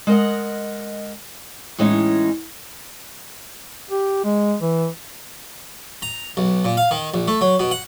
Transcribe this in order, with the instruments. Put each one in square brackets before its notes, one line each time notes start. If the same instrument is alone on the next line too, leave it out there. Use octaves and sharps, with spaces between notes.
[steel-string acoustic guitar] G#3 A#4 D#5 F#5
A2 E3 G#3 C#4 D#4
[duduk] G4
G#3
E3
[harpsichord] A#5
B1
A#2
F5
D#3
A#1
A3
F#3
B2
F#5